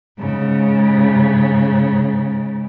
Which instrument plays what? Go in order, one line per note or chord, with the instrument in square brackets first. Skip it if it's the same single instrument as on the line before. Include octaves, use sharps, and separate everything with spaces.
[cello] G#2 C#3